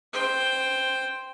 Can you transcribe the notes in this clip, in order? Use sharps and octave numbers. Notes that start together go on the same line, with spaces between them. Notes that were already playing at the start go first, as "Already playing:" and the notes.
C5 G5